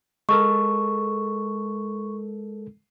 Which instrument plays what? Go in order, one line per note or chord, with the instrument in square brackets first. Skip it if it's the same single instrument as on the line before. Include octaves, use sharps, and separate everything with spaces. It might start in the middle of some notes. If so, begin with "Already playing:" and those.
[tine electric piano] G#3 A4 A#4 [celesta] C#6